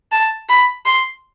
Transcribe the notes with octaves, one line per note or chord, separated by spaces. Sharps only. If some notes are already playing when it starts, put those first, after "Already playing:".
A5
B5
C6